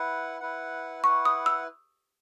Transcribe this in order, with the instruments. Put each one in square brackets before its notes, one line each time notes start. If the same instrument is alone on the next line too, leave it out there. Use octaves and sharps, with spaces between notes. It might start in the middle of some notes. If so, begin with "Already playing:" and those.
Already playing: [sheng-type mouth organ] E4 B4 F#5
E4 B4 F#5
[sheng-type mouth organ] E4 B4 F#5 [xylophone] C#6
[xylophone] D#6
E6